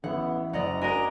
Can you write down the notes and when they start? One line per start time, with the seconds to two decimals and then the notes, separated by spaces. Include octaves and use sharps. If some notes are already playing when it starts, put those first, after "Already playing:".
0.04 A1 B3 E4 F#5
0.53 F#1 D5 D#5 F#5 A#5
0.81 D4 F#4 A#4 D#5 G#5 A#5